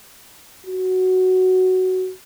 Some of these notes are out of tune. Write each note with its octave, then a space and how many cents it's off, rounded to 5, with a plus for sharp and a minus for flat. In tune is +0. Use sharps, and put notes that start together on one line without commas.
F#4 +5